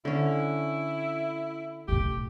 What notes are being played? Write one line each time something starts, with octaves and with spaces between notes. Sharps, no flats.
D3 C#4 E4
B1 A2 G4